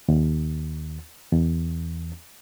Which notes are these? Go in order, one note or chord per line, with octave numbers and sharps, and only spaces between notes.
D#2
E2